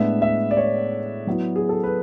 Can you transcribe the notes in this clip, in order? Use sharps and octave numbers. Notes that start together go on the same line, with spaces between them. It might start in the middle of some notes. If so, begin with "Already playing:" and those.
Already playing: A2 G#3 B3 D4 E5
E5
D5
C#5
F#3 B3 E4
G#4
A4
B4